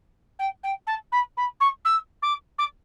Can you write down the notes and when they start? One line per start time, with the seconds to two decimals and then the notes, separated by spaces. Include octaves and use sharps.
0.39 G5
0.63 G5
0.86 A5
1.12 B5
1.37 B5
1.60 C#6
1.84 E6
2.22 D6
2.58 D6